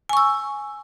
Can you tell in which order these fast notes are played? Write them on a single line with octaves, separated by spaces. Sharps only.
G#5 C#6 E6